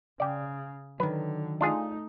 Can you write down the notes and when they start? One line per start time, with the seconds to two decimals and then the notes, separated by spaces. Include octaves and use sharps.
0.20 C#3 D5 G5
1.00 D3 D#3 F#3 B4
1.61 A3 D4 D#4 F4 G#4